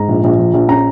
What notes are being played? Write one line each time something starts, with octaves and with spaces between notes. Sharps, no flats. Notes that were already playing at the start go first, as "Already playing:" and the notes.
Already playing: G#2 A#5
A#1
A#1
F3
A#1
C#4 A#5